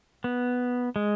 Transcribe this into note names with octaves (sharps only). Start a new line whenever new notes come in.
B3
G#3